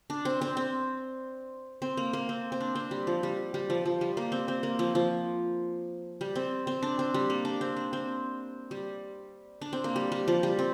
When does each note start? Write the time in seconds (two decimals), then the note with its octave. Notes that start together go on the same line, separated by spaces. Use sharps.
0.10 D4
0.25 C4
0.41 C4
0.57 C4
1.82 C4
1.97 A#3
2.13 A#3
2.29 C4
2.52 C4
2.60 D4
2.75 C4
2.91 G3
3.07 F3
3.23 G3
3.54 G3
3.70 F3
3.86 F3
4.01 G3
4.17 A#3
4.32 C4
4.48 C4
4.63 A#3
4.79 F3
4.95 F3
6.21 G3
6.35 C4
6.67 C4
6.82 D4
6.99 C4
7.14 G3
7.30 A#3
7.45 D4
7.61 C4
7.77 D4
7.93 C4
8.71 G3
9.61 D4
9.73 C4
9.84 A#3
9.96 G3
10.12 G3
10.28 F3
10.43 G3
10.59 C4